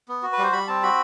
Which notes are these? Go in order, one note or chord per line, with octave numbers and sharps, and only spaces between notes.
B3
F#4
B4
G3 C5
G3 B5
C4 A5
F#4 B5